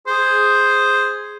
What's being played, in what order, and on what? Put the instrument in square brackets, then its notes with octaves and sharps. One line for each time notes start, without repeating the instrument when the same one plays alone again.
[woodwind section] G#4 [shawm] C5